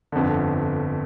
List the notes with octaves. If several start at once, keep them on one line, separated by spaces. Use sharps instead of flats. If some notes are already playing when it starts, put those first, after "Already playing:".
G1 F2 D3